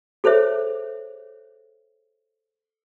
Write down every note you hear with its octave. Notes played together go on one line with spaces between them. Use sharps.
G#4 A4 C5 C#5 E5